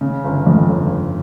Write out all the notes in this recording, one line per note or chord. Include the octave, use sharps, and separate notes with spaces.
C#3
G1
F2
G1
G1